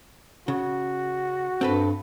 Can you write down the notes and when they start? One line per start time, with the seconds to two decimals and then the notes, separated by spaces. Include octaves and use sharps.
0.48 C#3 F#4
1.61 G2 C4 A4 B4